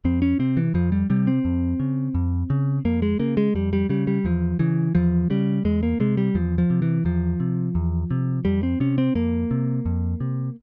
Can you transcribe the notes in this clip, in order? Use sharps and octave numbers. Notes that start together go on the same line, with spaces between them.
F2 C4
C#4
C3 C4
E3
F2 F3
G3
C3 G3
C4
F2
C#3
F2
C#3
F2 A#3
G#3
C#3 A#3
G#3
F2 G3
G3
C#3 G3
G3
E2 F3
C#3 E3
E2 F3
C#3 G3
E2 G#3
A#3
C3 G#3
G3
E2 F3
F3
C3
E3
E2 F3
C3
E2
C3
F2 G3
C4
C3 C#4
C4
F2 A#3
C3
F2
C3